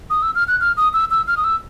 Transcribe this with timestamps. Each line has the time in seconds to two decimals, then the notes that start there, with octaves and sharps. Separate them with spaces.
0.10 D#6
0.22 E6
0.35 F6
0.48 F#6
0.61 F6
0.77 D#6
0.93 E6
1.11 E6
1.27 F6
1.37 D#6
1.44 E6